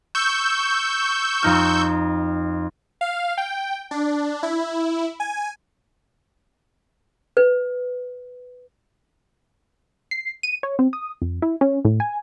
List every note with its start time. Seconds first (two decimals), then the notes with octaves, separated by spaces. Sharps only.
0.15 C#6 E6 G6
1.43 F2 D#4 F6
3.01 F5
3.38 G5
3.91 D4
4.43 E4
5.20 G#5
7.37 B4
10.11 C7
10.43 D#7
10.63 C#5
10.79 C4
10.93 D#6
11.22 F2
11.42 E4
11.61 C#4
11.85 A2
12.00 G#5